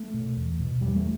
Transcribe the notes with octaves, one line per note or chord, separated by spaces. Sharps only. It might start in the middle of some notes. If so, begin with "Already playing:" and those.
Already playing: A3
B2
E2
B2
E2 G3
A3